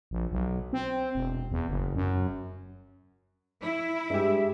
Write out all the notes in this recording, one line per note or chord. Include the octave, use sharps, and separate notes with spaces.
A#1
B1
C4
E1
E2
F#1
F#2
E4
G2 G#3 G4 E5